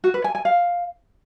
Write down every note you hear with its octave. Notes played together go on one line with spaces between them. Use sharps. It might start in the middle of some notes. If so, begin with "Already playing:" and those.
F#4
B4
G#5
G#5
F5